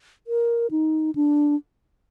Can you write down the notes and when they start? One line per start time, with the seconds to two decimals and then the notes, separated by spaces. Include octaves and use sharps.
0.27 A#4
0.71 D#4
1.15 D4